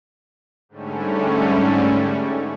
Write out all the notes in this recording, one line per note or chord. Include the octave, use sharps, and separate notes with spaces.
G#2 D3 G3 A3 C#4